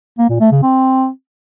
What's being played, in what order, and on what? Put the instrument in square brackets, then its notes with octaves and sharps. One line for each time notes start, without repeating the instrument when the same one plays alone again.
[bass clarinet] A#3
A#2
A3
C#3
C4